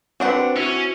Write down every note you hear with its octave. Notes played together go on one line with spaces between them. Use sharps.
F#3 C4 D4 F#4 B4 F#5
C#4 E4 F#4